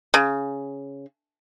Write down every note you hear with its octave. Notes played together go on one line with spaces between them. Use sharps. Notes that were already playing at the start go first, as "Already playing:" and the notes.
C#3